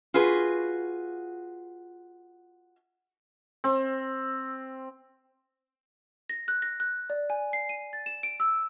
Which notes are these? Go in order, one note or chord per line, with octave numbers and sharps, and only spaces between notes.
F4 F#4 G#4 B4
C4
A#6
F#6
A#6
F#6
D5
G#5
C7
D#7
A6
E7
D7
E6